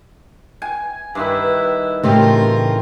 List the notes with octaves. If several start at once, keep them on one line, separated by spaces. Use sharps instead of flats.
G#5
G2 D#3 E4 B4
A2 C#3 E3 C4 F4 G4 A#4